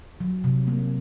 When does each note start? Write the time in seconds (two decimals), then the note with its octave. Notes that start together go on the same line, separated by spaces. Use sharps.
0.20 F#3
0.44 C3
0.67 A#3